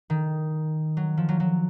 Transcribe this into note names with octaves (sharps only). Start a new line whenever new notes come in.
D#3
F#3
F3
F#3
F#3